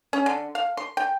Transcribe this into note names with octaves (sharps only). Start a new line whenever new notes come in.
C#4
D3
F5
C6
G5